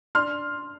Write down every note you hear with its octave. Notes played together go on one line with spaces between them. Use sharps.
D4 C6 F6